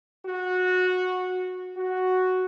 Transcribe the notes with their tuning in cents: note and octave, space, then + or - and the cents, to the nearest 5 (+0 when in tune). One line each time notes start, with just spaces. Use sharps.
F#4 -15
F#4 +0